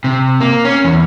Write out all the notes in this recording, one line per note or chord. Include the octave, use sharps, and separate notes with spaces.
C3
A#3
C#4
E2